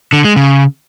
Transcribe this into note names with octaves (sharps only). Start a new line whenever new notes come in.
D3
G#3
C#3